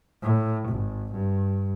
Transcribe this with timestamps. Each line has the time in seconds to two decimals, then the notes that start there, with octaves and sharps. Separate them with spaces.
0.23 A2
0.68 G#1
1.13 G2